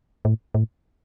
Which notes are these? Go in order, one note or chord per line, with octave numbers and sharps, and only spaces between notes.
A2
A2